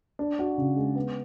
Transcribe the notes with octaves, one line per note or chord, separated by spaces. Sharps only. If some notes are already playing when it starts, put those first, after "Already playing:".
D4
F#4
C#3
G#3
B3